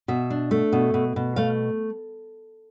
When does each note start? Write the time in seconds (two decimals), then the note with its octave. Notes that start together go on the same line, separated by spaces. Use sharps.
0.08 B2 E5
0.30 D4
0.51 A3
0.72 B2
0.94 B2
1.16 B2
1.36 A3 F5